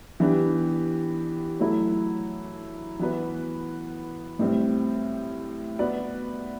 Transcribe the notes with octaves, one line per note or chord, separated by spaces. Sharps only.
E3 B3 D4 G4
F#3 A3 E4
E3 B3 F#4 B4
A2 G3 C4
B3 F#4 B4 D5